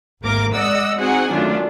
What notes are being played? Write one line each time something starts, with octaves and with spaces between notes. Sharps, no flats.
G#1 D2 A#3 A#4 D6
G#3 D5 D#5 F#5 E6
C4 D#4 F#4 G#4 F#5 G#5
F#2 D#3 A3 D4 F4